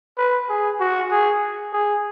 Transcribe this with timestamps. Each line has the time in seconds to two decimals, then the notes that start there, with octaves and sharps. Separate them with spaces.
0.18 B4
0.49 G#4
0.80 F#4
1.11 G#4
1.73 G#4